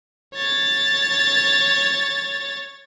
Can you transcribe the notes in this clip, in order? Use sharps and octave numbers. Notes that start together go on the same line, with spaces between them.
C#5 A6